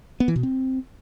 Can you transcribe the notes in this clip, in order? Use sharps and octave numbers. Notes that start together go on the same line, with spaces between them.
B3
E3
B2
C4